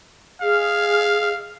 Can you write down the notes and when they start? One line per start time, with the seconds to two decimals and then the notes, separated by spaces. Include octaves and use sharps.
0.42 G#4 F5 F6